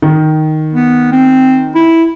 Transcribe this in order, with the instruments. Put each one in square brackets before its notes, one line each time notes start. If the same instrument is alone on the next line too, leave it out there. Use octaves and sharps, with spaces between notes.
[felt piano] D#3
[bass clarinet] B3
C4
E4